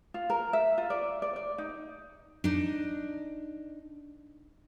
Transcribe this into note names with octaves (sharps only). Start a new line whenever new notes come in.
F4
A#4
E5
F4
D5
D5
D5
D#4
D4 D#4